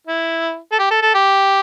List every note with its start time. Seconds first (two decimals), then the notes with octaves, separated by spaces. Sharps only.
0.07 E4
0.72 A4
0.79 G4
0.91 A4
1.02 A4
1.14 G4